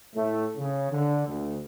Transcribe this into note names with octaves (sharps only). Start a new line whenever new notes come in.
A2 A3
C#3
D3
D2